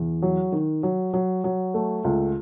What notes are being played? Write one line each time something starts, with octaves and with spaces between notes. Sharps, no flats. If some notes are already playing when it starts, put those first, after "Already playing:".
Already playing: E2
F#3
D#3
F#3
F#3
F#3
A3
C#2